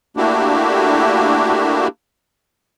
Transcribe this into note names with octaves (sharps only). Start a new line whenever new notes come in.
A3 A#3 D4 E4 F#4 G4